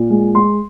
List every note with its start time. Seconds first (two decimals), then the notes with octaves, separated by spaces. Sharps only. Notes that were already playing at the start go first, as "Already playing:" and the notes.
Already playing: A#2
0.10 G#3
0.34 G#3 C6